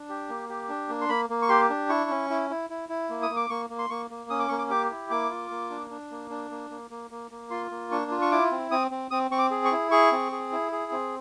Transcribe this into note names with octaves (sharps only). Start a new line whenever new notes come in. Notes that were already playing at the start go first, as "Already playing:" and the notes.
Already playing: D4
G4
A#3
G4
D4
A#3
C6
A#3 B5
A#3
C#6
G4 C6
D4
E4 C#6
C#4
E4
E4
E4
E4
A#3
D#6
A#3
D6
A#3 C#6
A#3
C6
A#3 C#6
A#3
C#4 D#6
D6
A#3 C#6
D6
G4 D6
E4
A#3 D6
F4
A#3
D4
D4
A#3
D4
A#3
A#3
A#3
A#3
A#3
F4 C6
A#3
D4 C#6
F4
C#6
E4 D6
C4
C4 D#6
C4
C4 D#6
C4 C#6
D6
G#4
C#6
E4
G#4 C#6
C4
G#4
E4
G#4
C4